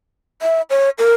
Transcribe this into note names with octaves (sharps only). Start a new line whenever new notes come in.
E5
C#5
A#4